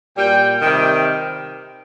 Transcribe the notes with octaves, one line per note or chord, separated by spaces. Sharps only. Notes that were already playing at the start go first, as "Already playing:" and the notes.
A#2 G3 G5
C3 D#3 G3 G5